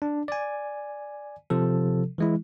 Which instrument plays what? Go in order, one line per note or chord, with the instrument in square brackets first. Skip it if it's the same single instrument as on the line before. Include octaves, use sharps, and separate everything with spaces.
[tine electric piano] D4
D5 G#5
C3 F3 A4
E3 G#3 E4